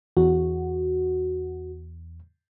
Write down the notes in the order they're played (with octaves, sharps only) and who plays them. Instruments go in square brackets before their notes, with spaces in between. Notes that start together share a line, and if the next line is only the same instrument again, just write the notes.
[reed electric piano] E2 [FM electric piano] F#4